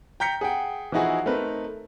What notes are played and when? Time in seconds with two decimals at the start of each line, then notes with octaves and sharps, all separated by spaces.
0.20 G5 A#5 G6 B6 C#7
0.41 G#4 F#5 G5
0.92 E3 F3 D#4 E4 F#4 G#4
1.26 A3 C4 D#4 A#4 B4